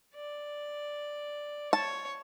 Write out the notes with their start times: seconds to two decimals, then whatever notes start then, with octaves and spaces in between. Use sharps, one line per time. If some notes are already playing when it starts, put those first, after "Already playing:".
0.14 D5
1.73 C#5 A5